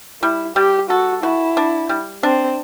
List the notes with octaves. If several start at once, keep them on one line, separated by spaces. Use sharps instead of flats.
G3 E4
G3 G4
F#4 A4
E4 F#4
D4
G3
C4 D4